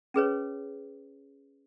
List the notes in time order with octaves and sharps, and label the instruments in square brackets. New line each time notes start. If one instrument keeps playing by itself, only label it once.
[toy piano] C#4 G#4 B4 C#5